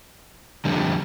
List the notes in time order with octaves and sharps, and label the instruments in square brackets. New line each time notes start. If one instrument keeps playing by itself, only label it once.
[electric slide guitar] F2 D3 G3